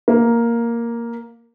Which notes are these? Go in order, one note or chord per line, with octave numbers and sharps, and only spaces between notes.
A#3